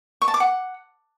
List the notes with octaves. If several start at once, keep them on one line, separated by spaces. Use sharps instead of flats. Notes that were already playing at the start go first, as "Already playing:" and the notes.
C#6
A5
D6
F#5